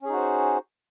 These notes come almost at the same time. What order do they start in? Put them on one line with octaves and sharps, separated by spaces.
C#4 G#4 D#4 F#4 C5